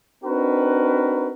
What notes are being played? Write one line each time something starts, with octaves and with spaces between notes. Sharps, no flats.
C4 D4 D#4 F#4 A#4 B4